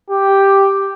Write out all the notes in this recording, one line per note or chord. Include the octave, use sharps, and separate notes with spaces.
G4